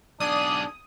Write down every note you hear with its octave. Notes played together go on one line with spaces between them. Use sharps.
B1 D4 G#4 D5 D#6